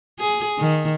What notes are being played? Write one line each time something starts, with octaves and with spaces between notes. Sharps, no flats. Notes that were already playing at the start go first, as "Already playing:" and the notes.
G#4
D#3